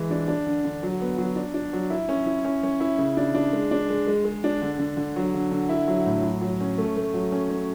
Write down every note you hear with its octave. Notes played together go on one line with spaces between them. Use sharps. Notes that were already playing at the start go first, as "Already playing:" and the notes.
Already playing: E3 G#3
D4
D4
D3
D3
F#3
B3
F#3
D4
D4
F#3
E4
C#4
E4
C#4
C#4
E4
C#3
D4
D4
G#3
D4
G#3
G#3
G#3
D4
D3
D3
D3
F#3
D3
D3
E4
F#3
A2
F#3
F#3
C#4
A3
A3
F#3
C#4
C#4